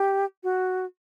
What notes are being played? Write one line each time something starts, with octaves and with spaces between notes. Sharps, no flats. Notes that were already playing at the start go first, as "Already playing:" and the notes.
Already playing: G4
F#4